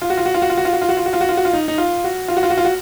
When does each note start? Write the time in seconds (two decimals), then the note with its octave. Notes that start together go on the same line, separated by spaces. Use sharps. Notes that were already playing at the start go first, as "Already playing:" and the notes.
0.02 F4
0.10 F#4
0.17 F4
0.26 F#4
0.34 F4
0.42 F#4
0.50 F4
0.57 F#4
0.65 F4
0.73 F#4
0.82 F4
0.89 F#4
0.97 F4
1.06 F#4
1.13 F4
1.21 F#4
1.29 F4
1.37 F#4
1.45 F4
1.53 D#4
1.68 D#4
1.78 F4
2.04 F#4
2.28 F4
2.37 F#4
2.43 F4
2.50 F#4
2.57 F4
2.65 F#4